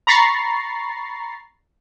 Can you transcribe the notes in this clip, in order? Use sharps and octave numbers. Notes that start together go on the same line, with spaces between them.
A#5 B5 C#6 A6 C7